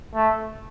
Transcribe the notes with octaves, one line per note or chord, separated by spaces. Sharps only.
A3